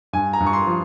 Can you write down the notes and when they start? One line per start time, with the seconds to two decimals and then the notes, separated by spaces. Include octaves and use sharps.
0.13 G2 G#5
0.33 A#5
0.40 G2
0.47 C#6
0.53 C6
0.67 F3